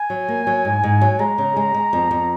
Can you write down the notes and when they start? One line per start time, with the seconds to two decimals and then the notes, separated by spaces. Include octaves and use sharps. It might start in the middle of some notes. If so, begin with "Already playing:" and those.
Already playing: G#5
0.10 F#3
0.28 A#3
0.47 F#3
0.65 G#2
0.84 G#2
1.01 F#3
1.19 G#3 A#5
1.38 C#3
1.56 G#3
1.74 G#3
1.93 F2
2.11 F2